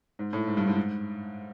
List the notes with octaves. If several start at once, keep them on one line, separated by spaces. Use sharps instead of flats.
G#2
A2
G#2
G2
G#2
G#2